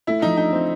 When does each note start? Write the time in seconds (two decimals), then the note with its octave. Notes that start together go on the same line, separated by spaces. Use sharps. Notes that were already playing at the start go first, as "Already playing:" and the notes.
0.07 A3 E4
0.22 F3 D#4
0.37 D4 D#4
0.53 A3 C4